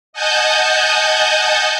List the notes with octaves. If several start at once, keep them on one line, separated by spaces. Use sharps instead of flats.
D#5 F#5 G#5 A5 G6